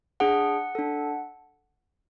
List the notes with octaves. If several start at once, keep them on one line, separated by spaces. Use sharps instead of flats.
D4 G#4 F#5
D4 A4